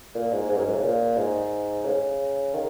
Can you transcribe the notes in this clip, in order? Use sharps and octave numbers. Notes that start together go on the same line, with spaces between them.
A#2
G#2
G#2
F#2
G#2
C#3
A#2
G#2
C#3
D#3